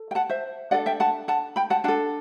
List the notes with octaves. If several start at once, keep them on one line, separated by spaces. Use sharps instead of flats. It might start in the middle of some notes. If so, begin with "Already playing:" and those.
Already playing: A4
G5
F#5 A5
C5 E5
D4 A4 D5 F#5
E5 G5
F#5 A5
F#5 A5
G5 B5
F#5 A5
D4 A4 F#5 A5